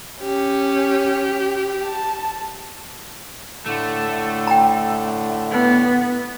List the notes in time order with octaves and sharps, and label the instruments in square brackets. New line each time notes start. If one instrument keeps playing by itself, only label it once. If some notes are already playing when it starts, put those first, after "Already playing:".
[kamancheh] C#4 [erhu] G4
[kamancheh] A5
[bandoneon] A2 D3 [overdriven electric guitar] A3
[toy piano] G5 A#5
[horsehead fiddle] B3